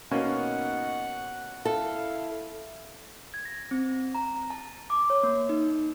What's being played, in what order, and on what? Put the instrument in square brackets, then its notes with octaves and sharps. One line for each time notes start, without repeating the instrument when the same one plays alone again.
[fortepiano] B2 A#3 C#4 [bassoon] D#4 [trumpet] F#5
[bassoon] E4 [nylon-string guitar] A4 [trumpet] F5
[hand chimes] G#6
A#6
C4
A#5
A5
D6
C#5
A#3
D#4